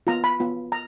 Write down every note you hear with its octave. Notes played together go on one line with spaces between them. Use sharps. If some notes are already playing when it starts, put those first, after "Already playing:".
B3 F4 A#5
B5
B3 F4
A#5